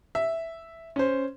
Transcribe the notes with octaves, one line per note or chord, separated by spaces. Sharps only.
E5
C#4 C5